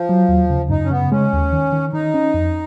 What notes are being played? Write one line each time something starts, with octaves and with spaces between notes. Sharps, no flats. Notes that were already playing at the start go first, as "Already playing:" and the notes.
Already playing: F3
F#3
D#2
C#3
F#2 D#4
C#4
C#3 B3
G#3 C#4
D#2
D#3
D#3
D#3 D#4
C#4
F2